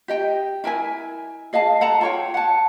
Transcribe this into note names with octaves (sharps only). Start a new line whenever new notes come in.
G4 D#5 G5
E4 A#4 E5 G#5
G#4 D#5 F5 A5
A4 F#5 A5 A#5
F4 C#5 G5
F#5 A5